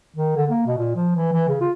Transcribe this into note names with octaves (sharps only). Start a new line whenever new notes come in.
D#3
D3
A#3
B2
A#2
F3
E3
E3
C#3
F4